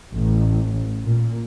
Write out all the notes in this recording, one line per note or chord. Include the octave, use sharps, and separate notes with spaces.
A1
A#2